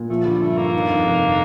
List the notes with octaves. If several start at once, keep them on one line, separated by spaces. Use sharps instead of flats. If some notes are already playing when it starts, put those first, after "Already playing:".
Already playing: A#2
F3 A3
D3 G3
G2 A3
G2 A#3
D#3
F2
F1